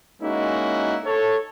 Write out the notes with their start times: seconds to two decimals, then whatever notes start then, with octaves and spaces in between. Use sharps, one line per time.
0.22 G#3 A#3 C#4 D#4 E4 F#4
1.05 A4 C#5